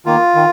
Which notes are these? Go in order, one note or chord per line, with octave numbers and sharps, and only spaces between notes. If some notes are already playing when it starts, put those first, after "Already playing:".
D#3 A#3 F4
D#3